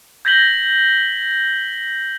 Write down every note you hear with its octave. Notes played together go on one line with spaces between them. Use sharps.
G6 G#6 A#6 B6 F#7 G7